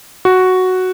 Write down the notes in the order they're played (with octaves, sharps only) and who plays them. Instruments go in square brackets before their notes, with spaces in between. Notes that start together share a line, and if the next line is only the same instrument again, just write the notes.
[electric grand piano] F#4